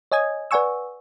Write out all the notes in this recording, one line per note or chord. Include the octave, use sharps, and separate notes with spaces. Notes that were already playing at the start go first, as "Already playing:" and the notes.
C#5 D#5 G#5 D#6 G#6
B4 D5 F#5 G#5 C#6 E6